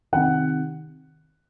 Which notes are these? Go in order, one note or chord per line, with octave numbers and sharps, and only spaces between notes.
C3 D#3 F#5